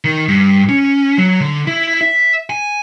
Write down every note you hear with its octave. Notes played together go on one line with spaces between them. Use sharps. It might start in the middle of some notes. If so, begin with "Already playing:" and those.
D#3
G2
C#4
F#3
D3
E4
E5
G#5